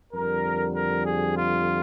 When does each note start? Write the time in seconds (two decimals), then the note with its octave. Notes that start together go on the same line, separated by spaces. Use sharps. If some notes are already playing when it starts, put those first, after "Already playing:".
0.13 F2 D3 G3 A#4
0.74 A#4
1.04 G#4
1.35 F4